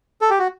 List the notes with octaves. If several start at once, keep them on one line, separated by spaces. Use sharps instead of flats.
A4
G4
F#4